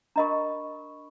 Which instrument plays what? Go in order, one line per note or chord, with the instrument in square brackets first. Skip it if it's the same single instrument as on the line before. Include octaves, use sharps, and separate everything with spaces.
[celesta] D4 B5 C#6 [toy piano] A#4 D#5 A#5